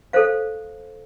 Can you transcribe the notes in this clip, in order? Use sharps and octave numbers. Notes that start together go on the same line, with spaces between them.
A4 C5 F5